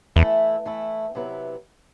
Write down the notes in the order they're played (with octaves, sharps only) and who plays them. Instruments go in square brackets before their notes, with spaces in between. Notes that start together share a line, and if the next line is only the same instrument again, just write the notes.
[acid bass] E2 [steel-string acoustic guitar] E3 A3 E4
[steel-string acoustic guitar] E3 A3 E4
C3 F#3 B3 E4 B4